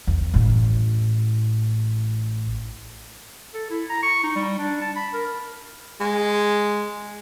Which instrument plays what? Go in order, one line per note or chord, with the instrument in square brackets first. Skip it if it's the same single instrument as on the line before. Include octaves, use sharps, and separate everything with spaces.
[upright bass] E2
A1 A2
[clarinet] A4
E4
A#5
C#6
D#4
G3
D4
A5
B5
A#4
[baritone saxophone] G#3